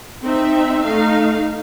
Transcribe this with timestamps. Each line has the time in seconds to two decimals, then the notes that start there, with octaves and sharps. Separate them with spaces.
0.23 C4 D#4 E5
0.85 A3 D#4 A4 F5